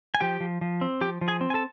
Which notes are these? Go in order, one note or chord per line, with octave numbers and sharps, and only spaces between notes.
G#5
F3 G4 G5
F3
F3
C4
F3 G4 G5
F3
G#4 G#5
C4
G#5
A4 A5